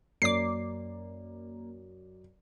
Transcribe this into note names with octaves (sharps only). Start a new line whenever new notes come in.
F#2 A#3 D5 D6 C7